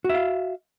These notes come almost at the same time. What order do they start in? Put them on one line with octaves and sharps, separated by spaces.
F#4 E5 F5